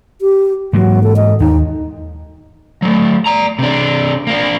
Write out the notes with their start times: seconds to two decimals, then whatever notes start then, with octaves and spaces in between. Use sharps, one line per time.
0.21 G4
0.73 G#2 E3 F#3 A#3
1.03 A4
1.16 D#5
1.40 D#2 D#4
2.82 F#3 A3
3.26 D5 A#5
3.59 C3 D4
4.27 A#3 D4